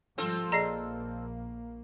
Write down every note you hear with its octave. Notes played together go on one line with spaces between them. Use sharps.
G#1 F3 G3 C4 F4 A4
A#1 A#3 G#4 D5 D#5 A#5 A#6 C7